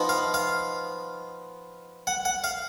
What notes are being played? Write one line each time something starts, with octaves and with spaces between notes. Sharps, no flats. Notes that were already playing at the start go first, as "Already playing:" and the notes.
Already playing: F3 B3 D#4
F5
F5
F#5
F#5
F5